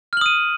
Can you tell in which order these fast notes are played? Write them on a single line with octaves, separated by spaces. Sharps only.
F6 F#7 D#6 D#7